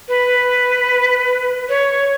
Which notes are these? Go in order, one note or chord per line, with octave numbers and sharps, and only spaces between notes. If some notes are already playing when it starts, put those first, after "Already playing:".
B4
C#5